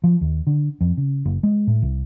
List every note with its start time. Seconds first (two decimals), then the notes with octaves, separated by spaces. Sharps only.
0.04 F3
0.21 D#2
0.47 D3
0.81 F2
0.97 C#3
1.25 F#1
1.43 G#3
1.67 A2
1.82 C2